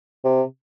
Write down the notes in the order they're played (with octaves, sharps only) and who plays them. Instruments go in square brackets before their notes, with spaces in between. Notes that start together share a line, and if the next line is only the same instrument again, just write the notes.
[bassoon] C3